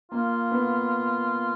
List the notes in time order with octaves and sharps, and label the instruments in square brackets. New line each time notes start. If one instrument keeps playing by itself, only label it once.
[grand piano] A#3 [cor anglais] F4
[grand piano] B3